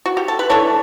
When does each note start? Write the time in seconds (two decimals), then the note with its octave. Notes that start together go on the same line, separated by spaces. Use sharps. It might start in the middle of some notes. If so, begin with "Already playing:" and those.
0.06 F#4
0.17 G4
0.28 A4
0.39 B4
0.50 E3 A3 D4 A4 C#5